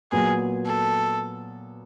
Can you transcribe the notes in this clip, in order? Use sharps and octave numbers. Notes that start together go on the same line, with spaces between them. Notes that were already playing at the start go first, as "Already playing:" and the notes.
A#2 F#3 B3 G#4
A4